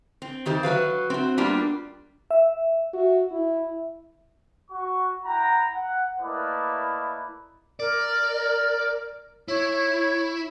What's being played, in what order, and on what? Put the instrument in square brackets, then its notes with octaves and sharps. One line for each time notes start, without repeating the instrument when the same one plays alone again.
[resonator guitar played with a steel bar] C4
F2 D#3 G4 C5
F#3 F#4 B4 F5
C4 F#4
G3 A#3 B3 D4 F4 G4
[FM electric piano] E5
[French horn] F#4
E4
[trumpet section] F#4 C#6
E4 F#5 G5 A#5
F#5
A3 A#3 E4 B4 D5 D#5
[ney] A#4 [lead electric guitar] D5
[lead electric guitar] E4 [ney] C#5